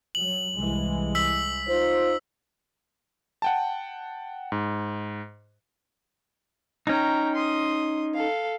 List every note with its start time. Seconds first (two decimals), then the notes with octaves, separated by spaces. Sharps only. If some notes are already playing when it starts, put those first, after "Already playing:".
0.15 F#3 F#7
0.56 C2 E3 G#3
1.15 E6 B6 F#7
1.67 D#4 F4 C5
3.42 F#5 G5 A5
4.52 G#2
6.87 C#4 D#4 G5 A#5 C#6
7.35 C6 D#6
8.14 A4 F5